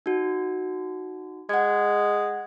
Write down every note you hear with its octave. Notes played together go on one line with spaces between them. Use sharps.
D#4 F#4
G#3 F#5 G#6